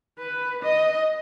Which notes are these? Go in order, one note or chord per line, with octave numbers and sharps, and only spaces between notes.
B4
D#5